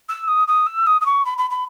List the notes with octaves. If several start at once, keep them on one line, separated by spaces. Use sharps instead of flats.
E6
D#6
D#6
E6
D#6
D#6
C#6
B5
B5
B5